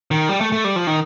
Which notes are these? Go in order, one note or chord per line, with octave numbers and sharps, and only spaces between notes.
D#3
G3
A3
A3
G3
F3
D#3